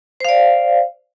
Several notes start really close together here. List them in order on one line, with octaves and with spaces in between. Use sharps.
C5 F5 D5